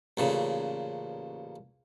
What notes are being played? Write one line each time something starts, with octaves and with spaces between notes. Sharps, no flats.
A1 A#2 C#3